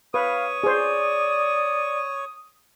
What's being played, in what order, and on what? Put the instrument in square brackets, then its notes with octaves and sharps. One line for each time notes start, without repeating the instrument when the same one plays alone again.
[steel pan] B4 [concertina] C#5 C#6 [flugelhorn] F5 [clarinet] D#6
[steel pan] G#4 C5 [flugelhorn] D5